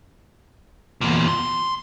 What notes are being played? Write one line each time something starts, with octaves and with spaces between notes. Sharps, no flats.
E2 A#2
C6